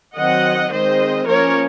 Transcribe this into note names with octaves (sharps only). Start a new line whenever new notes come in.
D#3 F#3 C4 D#5 F#5
D#3 G#3 C4 C5 D#5
F3 A#3 C#4 A#4 C#5